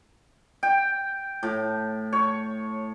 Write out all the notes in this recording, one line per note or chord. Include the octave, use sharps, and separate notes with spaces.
G5
A2
C#5